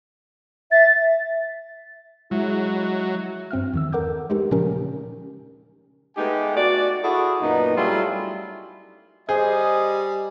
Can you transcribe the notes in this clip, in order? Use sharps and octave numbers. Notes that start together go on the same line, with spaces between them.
E5 A6
F#3 G#3 E4
G2 C4 E5 F6
E2 D#3 E6
A4 A#4 F#5 D6 G6
G#3 A3 D#4 G4 A#4
A#2 C#3 F3 C#4 G4 A#4
G#3 A3 B3 D#4 G4 G#5
F#4 D5
E4 F#4 G#4 A4
F#2 A#2 B3 D#4
F#3 G3 A3 E4 F4 G#4
G3 G#4 C5 D#5